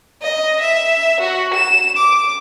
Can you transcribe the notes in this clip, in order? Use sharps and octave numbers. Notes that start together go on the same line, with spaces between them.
D#5
E5
F#4
E7
D6